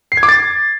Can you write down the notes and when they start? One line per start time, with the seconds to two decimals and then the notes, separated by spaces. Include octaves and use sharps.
0.12 C7
0.17 G#6
0.23 D6
0.29 A6